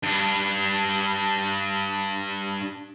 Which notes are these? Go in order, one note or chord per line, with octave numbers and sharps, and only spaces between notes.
G2 D4